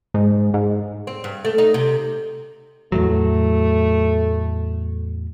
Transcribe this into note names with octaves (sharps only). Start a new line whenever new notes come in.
G#2
G#2
C4
G2
A3
D#4
C3
E2 A2 F#3 A3